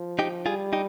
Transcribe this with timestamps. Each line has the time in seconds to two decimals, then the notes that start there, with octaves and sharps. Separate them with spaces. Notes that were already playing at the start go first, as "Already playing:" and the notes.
Already playing: F3
0.19 D#4 G4
0.46 G3 F4 G#4
0.73 D#4 G4